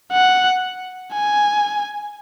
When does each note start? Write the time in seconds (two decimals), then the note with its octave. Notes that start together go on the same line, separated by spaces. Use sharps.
0.12 F#5
1.13 G#5